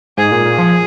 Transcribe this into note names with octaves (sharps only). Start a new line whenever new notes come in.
G#2 G#4
A#2
A#2
F3